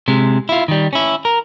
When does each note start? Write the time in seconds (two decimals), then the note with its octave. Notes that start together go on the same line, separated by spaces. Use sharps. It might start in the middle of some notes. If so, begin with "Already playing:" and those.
0.08 C3 G#3
0.49 E4 F4
0.68 D#3 G3
0.93 C#4 E4
1.25 A#4